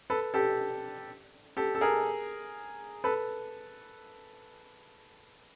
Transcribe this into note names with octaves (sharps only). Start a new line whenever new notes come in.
A4 B4
G4 A4
G4 A4
A4
G#4 A#4
A4 B4